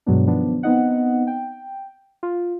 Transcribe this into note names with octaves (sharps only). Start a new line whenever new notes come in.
G2 B2 F#3 G#3 B3 D4
D#3 F3 F#3 B3 D4
B3 C4 D#4 D#5 F#5
G5
F4